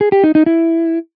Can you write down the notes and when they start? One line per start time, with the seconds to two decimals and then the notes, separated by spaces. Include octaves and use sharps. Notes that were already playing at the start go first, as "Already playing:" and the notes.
0.01 G#4
0.12 G4
0.24 D#4
0.35 D#4
0.46 E4